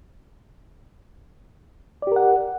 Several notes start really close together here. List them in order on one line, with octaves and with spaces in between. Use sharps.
D5 G4 A#4 F#5